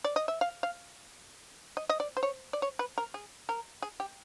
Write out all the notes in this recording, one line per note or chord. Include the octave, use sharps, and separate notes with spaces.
D5
D#5
E5
F5
F5
D#5
D#5
D5
C5
C#5
D5
C#5
B4
A#4
G#4
A#4
G#4
G4